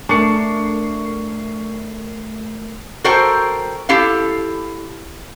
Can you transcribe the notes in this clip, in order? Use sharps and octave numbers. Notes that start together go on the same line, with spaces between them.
A3 D4 A#4 C#6 C7 C#7
F#4 A4 A#4 C5 G5
E4 G4 A4 F5